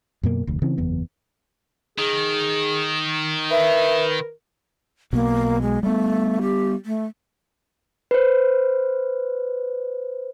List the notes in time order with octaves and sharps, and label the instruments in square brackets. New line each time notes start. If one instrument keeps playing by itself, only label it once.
[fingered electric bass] F#2 B2 A#3
F1 D2
C#3 E3 C4
F#1 E2 B3
[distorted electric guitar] D#3 [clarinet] G#4
[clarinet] A#4 [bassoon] B4 [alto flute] E5
[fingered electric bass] B1 B2 [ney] A#3
[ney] G#3
[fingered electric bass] G3 B3 [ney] A3
[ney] G4
A3
[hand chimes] B4 C5